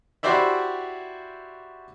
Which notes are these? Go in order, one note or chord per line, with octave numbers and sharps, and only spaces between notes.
E4 F#4 G4 C5 D5 E5